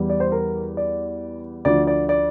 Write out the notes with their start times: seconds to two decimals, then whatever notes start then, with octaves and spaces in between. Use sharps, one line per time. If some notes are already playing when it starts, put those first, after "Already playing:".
Already playing: E2 E3 G3
0.10 D5
0.20 C5
0.32 A#4
0.77 D5
1.65 D2 D3 F3 D5
1.87 D5
2.09 D5